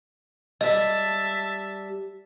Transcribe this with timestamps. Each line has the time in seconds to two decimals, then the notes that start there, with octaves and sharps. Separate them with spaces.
0.61 G3 D#5 E5 A5